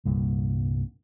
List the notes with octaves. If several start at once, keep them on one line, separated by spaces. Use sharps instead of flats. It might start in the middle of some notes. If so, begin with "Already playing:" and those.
C2 G2 A#2